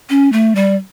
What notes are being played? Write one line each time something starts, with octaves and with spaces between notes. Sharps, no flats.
C#4
A3
G3